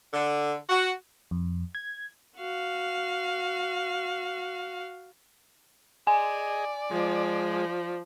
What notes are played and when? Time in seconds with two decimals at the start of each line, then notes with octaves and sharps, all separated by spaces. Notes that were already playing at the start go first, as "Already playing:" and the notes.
0.14 D3
0.70 F#4
1.31 F2
1.75 G#6
2.37 F#4 F5
6.07 G#4 D5 D#5 G#5
6.91 F3 G#3